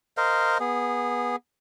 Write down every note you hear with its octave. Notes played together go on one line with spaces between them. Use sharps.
A#4 C5 D#5 F5
B3 G#4